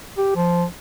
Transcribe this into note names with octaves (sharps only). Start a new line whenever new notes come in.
G4
F3